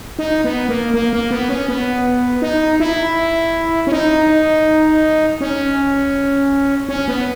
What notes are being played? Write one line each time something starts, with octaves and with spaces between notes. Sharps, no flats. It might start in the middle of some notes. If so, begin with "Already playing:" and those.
D#4
B3
A#3
A#3
A#3
B3
C#4
B3
D#4
E4
C#4
D#4
C#4
C#4
B3